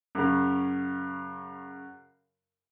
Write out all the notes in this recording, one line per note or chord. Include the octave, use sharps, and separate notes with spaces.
F#2 C#3